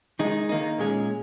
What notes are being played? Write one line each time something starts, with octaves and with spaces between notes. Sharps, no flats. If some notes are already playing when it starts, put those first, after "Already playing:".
D#3 G#3 D#4 G#4
D#3 A#3 D#4
A#2 G#3 C#4 G#4